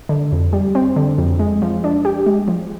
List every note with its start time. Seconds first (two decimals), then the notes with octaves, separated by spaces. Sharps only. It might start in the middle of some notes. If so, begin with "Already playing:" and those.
0.09 D3
0.32 F2
0.53 G3
0.75 C4
0.96 D3
1.18 F2
1.39 G#3
1.62 F3
1.84 D4
2.05 G4
2.26 G#3
2.48 F3